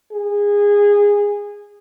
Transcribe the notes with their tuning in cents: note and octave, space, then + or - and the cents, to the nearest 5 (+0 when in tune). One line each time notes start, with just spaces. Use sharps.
G#4 -20